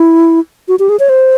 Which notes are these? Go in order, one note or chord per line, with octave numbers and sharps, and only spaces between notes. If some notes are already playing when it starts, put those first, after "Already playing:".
Already playing: E4
F#4
G4
G#4
C#5
C5